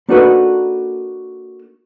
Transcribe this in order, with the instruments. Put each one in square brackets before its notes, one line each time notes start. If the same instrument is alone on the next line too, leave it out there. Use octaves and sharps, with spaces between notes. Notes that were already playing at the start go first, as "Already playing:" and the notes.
[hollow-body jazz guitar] A#3 D4 D#4 F#4 A4 B4